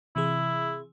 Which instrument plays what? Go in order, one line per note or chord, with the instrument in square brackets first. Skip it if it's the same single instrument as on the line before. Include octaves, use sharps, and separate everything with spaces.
[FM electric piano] C3 E3 G#4 [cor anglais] E4